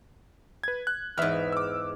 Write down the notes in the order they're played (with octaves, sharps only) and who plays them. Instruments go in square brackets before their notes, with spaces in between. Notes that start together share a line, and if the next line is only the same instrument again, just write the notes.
[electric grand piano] B4 G#6
F#6
[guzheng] E2 G#2 [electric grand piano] E5 F6
[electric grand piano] D6 E6